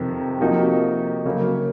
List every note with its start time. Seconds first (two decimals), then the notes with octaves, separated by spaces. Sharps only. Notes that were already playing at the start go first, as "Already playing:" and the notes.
Already playing: F2 C3 D#3
0.40 C3 F3 A#3 D#4 F#4
1.25 C#3 F#3 A#3